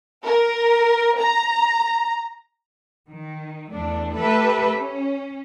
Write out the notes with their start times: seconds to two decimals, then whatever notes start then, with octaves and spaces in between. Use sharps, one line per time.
0.23 A#4
1.18 A#5
3.10 D#3
3.72 E2 A3 D4
4.17 A3 G4 A4 B4 E5
4.75 C#4